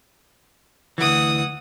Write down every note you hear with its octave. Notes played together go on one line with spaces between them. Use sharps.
D2 E3 F#5 D#6